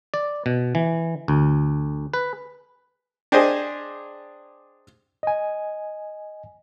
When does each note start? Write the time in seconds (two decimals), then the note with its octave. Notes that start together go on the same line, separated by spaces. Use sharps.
0.14 D5
0.46 B2
0.75 E3
1.28 D2
2.14 B4
3.32 D4 G4 G#4 C5 D#5
5.23 D#5 G#5